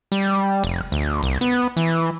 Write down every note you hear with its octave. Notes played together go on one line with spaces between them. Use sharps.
G3
F1
D2
C2
B3
E3